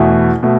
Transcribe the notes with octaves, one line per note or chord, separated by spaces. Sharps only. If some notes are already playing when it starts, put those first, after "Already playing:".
Already playing: E2 B2 A3 E4
B2 A3